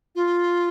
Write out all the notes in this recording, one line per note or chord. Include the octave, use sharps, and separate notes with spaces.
F4